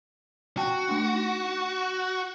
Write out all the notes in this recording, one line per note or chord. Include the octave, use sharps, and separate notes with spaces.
F#4 G5 A5
A3 D4
D#4